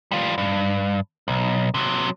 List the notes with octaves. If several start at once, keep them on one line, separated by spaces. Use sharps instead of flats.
G3 F4
G2
B1
C3 F#3